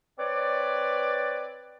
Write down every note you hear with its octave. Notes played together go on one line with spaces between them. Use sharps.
C4 B4 C#5 D5